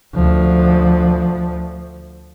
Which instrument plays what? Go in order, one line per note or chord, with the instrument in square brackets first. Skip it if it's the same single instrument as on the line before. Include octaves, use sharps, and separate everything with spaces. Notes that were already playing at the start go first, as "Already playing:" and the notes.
[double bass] D2 F3